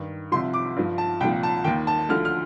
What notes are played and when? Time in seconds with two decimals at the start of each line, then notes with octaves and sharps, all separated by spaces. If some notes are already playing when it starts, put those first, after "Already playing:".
Already playing: G2 D#3
0.32 C2 C3 F3 C6
0.54 D6
0.76 G2 F3
0.98 A5
1.20 C2 A#2 F3 G5
1.43 A5
1.64 D#2 D#3 G5
1.87 A5
2.09 D2 D3 F3 F6
2.25 F6